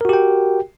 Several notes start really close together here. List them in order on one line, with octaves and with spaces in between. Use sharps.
A#4 F#4 G4 G5